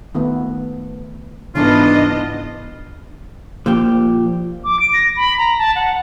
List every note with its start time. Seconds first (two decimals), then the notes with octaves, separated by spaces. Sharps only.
0.14 D#3 A3 B3
1.55 G#2 C#3 E3 B3 D4 E4 F4 D#5
3.66 A#2 F3 G4
4.64 D6
4.80 D7
4.93 A#6
5.16 B5
5.38 A#5
5.59 A5
5.76 F#5